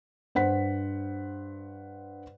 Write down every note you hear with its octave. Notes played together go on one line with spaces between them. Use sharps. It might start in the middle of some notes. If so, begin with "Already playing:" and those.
G2 C5 F#5 B6